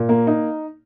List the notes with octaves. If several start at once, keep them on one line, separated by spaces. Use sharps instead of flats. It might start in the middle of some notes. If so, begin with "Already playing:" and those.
Already playing: A#2
A#3
D#4